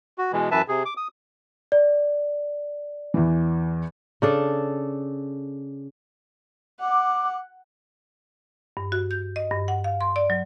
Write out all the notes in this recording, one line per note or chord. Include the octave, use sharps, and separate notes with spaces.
F#4
B2 E3 G#3
F#2 E3 B4 E5 A5
C3 G#4
D6
D#6
D5
E2 E3
C#3 D4 A4
F#5 D6
G2
F#4
G6
D#5
G2
F#5
F5
C6
D5
F#3